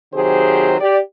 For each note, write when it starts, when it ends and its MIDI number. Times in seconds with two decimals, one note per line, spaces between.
0.14 0.75 48
0.14 0.75 51
0.14 0.75 54
0.14 0.75 67
0.14 0.75 68
0.14 0.75 72
0.80 0.99 67
0.80 0.99 74